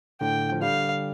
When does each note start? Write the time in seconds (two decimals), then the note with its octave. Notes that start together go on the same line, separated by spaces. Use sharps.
0.21 A2 D3 G5
0.52 F3
0.62 D3 G3 F5